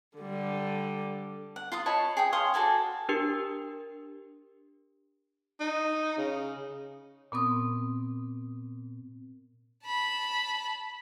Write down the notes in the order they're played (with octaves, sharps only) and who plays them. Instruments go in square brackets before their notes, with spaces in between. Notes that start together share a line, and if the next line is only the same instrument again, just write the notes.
[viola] D3 G3
[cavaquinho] F#5
F4 C6 D#6
C#5 D#5 A5 B5
G#4 G5 D#6
C#5 F5 C6 D#6
F#4 A4 D5 G#5
[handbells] D4 G4 A#4 C#7
[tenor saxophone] D#4
C#3
[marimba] A#2 B3 C4 D#6
[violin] A5 B5